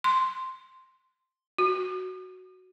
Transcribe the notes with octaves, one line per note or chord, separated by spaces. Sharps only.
C6
F#4